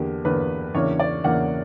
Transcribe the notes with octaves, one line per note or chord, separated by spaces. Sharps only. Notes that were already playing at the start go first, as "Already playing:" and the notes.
Already playing: E2 D3 A#3 G4
E2 D3 A#3 B4
E2 C#3 E3 A#3 D4 C#5
D5
E2 C#3 E3 A#3 D4 F#5